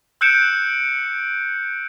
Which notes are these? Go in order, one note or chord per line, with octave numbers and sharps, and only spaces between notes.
E6 F#6 G6 C#7 D7 E7